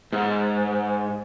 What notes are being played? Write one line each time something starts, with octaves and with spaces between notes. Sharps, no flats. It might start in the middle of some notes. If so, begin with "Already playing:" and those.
G#2